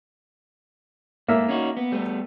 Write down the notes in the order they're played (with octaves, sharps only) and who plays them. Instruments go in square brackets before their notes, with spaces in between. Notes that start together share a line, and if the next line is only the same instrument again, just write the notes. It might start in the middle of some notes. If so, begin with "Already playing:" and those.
[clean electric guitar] G#2 A3 [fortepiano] A#3 E5
[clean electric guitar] C#4 D#4 F#4
B3
G3 A3 B3